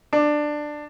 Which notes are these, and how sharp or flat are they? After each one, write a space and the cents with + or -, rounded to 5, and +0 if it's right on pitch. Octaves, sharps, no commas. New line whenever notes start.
D4 +15